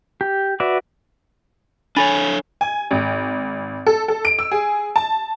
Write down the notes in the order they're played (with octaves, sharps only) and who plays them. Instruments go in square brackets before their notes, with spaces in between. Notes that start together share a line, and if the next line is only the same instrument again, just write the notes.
[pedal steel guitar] G4
F#4 B4 D5 E5
[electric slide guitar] D4 A4 C#5 [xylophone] G#5 B5 A6
[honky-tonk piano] G#5
G#1
A4
A4
D7
E6
G#4
A5